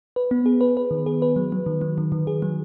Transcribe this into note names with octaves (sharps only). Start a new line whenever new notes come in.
B4
B3
G#4
B4
B4
D#3
G#4
B4
F#3
F#3
D#3
F#3
D#3
D#3
G#4
F#3